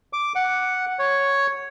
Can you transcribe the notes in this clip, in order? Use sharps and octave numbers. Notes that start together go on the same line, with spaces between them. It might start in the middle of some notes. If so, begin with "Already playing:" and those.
D6
F#5
C#5